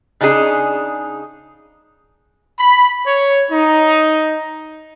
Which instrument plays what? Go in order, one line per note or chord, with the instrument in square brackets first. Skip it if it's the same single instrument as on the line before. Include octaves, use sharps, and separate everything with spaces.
[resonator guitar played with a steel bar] C#3 D4 D#4 G#4
[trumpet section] B5
C#5
D#4